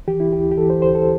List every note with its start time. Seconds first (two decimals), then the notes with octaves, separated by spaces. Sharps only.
0.08 E3 G4
0.20 E4
0.32 D2 G4
0.52 G4
0.58 E3 A4
0.70 C5
0.82 D2 C5
0.95 A4